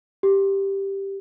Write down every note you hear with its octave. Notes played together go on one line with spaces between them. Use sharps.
G4